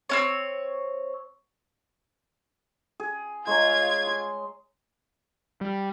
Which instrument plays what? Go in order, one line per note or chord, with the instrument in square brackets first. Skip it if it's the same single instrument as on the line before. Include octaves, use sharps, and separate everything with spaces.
[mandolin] C4 C#4 C#5
[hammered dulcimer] G#4
[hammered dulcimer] G#3 C#5 A#5 [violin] F4 G#6
[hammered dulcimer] C6
[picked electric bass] G3